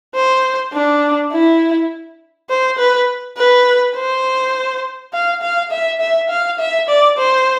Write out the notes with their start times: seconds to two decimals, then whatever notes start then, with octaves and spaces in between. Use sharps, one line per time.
0.15 C5
0.74 D4
1.33 E4
2.50 C5
2.79 B4
3.37 B4
3.96 C5
5.14 F5
5.42 F5
5.71 E5
6.01 E5
6.30 F5
6.59 E5
6.89 D5
7.18 C5